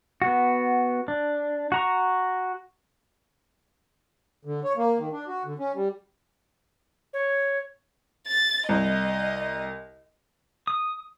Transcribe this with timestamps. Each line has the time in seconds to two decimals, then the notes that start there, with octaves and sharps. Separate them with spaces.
0.22 B3 F#4
1.08 D4
1.72 F#4 A#5 C#6
4.45 D3
4.64 C#5
4.77 A#3
4.98 D#3
5.12 D4
5.28 F#4
5.45 D3
5.59 C#4
5.74 G3
7.13 C#5
8.27 A6
8.69 C2 D#5
10.67 D#6